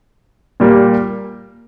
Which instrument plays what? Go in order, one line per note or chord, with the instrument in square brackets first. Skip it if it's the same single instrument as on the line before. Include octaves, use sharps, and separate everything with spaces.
[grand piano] A#2 G3 A#3